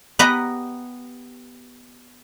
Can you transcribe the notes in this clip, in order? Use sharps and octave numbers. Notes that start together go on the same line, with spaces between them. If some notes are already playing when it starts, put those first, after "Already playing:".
B3 G4 B4 D#5 A#5